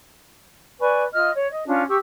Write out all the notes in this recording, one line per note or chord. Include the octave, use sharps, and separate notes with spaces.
B4 D5 G#5 C#6
F4 D#5 F6
C#5
D#5
C#4 D4 F4
G4 C#6 E6